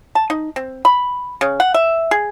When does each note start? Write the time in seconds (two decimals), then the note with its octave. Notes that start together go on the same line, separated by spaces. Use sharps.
0.15 A5
0.30 D#4
0.56 C4
0.85 B5
1.41 C#3
1.60 F#5
1.74 E5
2.11 G#4